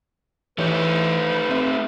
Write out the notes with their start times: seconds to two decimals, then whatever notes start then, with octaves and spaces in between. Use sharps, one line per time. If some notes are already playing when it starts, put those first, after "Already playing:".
0.58 E3 A3 D#4 G4 B4 C#5
1.50 C4 E5